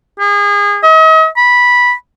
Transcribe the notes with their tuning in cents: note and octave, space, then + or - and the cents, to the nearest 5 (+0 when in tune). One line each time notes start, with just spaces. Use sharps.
G#4 -30
D#5 +40
B5 -10